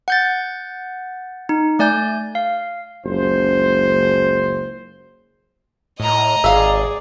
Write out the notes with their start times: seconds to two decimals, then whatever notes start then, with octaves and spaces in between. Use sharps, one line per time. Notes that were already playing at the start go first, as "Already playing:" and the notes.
0.08 F#5 G6 A6
1.49 D#4
1.79 A3 D5 G#5 G6
2.35 F5
3.05 F#1 C#2 C5
6.00 A2 D#5 A#5
6.44 G#1 G#4 D5 E5 F5